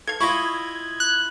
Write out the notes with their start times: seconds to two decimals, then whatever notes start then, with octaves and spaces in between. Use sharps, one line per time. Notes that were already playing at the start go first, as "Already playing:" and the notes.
0.07 A4 F5 G#6
0.20 E4 F4 D#5 C#6
1.00 F#6